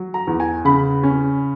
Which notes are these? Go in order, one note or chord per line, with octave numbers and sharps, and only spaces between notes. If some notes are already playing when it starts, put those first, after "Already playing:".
Already playing: F#3
A#5
E2
G#5
C#3 B5
C#4